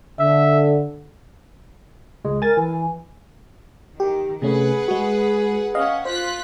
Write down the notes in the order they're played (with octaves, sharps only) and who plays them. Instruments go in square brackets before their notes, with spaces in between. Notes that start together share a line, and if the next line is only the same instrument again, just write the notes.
[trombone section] D3 [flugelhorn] E5
[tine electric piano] C#2 G#3
[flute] A#4 [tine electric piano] G#5 A6
[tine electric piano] E3 [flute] G#5
[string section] D#3 [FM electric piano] G4
[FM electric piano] C3 A3 C#4 [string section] G#4 B4 F#5
[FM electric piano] G#3 F#4
[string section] C#4 F#5 [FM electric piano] D#5 F5
[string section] F4 F#6 B6 [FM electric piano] C5